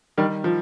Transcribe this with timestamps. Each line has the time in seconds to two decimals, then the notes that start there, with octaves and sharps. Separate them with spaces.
0.18 D#3 G3
0.44 F3